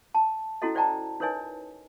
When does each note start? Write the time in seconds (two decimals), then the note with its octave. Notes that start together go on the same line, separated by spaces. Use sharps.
0.15 A5
0.62 C#4 E4 F#4 A4 D#5
0.75 C5 D5 D#5 G5 A5 A#5
1.20 D#4 A#4 B4 C#5 D#5 G#5